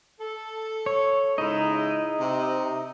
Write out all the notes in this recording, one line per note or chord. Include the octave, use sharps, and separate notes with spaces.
A4
C#5
G#2 C#3 D#4 E4 D#5
C3